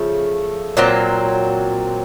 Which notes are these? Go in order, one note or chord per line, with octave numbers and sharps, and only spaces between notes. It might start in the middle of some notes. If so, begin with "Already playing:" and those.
Already playing: C#3 F3 A3
A#2 F#3 C4